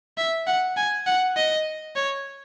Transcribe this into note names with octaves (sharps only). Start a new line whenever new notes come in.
E5
F#5
G#5
F#5
D#5
C#5